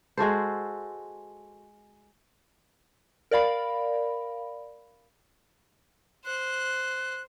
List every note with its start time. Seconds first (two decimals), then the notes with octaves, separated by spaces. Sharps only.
0.17 G#3 F#4 A4 C5
3.31 A#4 D5 F5 B5
6.26 C5 F#6